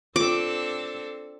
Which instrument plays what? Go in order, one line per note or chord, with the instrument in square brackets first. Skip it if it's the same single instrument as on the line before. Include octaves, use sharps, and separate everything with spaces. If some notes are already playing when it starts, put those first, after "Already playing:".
[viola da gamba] C4 D4 A4 [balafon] F4 [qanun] D6